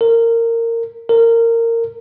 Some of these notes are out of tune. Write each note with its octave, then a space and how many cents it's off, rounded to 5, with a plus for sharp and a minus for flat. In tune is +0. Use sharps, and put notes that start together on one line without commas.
A#4 -20
A#4 -20